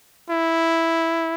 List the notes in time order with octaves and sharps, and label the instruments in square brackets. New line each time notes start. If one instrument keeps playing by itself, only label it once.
[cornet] E4